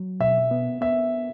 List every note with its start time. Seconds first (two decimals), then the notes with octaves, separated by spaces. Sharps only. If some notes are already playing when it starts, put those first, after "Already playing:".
Already playing: F#3
0.20 B2 E5
0.51 B3
0.81 B3 E5